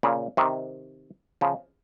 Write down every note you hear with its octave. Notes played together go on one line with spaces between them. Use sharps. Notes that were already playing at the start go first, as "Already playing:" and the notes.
A#2 C#3
C3 D#3
C#3 F3